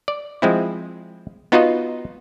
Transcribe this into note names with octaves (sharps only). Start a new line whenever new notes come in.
D5
F3 G#3 C4 E4
B3 D#4 F4 F#4 B4 D#5